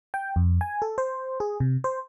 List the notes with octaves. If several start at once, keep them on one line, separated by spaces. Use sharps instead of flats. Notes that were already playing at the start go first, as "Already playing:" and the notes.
G5
F2
G#5
A4
C5
G#4
C3
C5